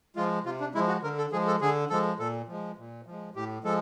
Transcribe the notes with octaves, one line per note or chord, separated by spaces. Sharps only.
F3 G#3 F4
C3 F4
D4
F3 G#3 E4
F#4
D3 A#4
A4
F3 G#3 G#4
A4
D3 G#4
F3 G#3 A4
A#2 A4
F3 G#3
A#2
F3 G#3
A2 G4
F3 G#3 A4